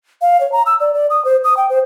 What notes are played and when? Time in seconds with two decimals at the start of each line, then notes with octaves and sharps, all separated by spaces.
0.22 F5
0.40 C#5
0.52 A#5
0.66 E6
0.80 D5
0.94 D5
1.10 D#6
1.25 C5
1.44 D#6
1.57 G5
1.69 C5